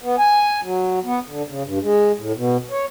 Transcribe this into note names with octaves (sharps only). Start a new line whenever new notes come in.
B3
G#5
F#3
B3
D3
C#3
G2
G#3
A2
B2
C#5